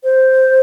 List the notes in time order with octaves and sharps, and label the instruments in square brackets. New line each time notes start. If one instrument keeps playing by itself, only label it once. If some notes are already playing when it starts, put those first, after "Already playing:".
[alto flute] C5